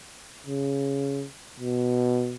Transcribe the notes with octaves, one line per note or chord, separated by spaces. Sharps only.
C#3
B2